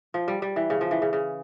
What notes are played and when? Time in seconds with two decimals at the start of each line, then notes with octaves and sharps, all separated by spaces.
0.14 F3
0.28 G3
0.42 G3
0.56 E3
0.70 C#3
0.81 F3
0.91 E3
1.02 C#3
1.13 C#3